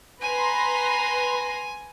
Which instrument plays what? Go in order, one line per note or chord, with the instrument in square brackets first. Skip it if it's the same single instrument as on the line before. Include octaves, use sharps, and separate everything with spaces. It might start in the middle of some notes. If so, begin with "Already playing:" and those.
[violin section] B4 A#5 C6 [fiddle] G#5